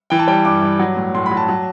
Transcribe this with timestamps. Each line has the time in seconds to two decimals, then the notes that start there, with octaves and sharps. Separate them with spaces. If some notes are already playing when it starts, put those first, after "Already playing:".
0.10 E3 G5
0.19 A5
0.27 G3 G5
0.45 G2 D6
0.62 G2
0.79 F#3
0.97 A2
1.15 A2 C6
1.26 B5
1.31 F#3
1.37 A5
1.49 F#3